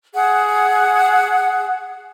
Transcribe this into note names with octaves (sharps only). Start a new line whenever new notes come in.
G#4 F#5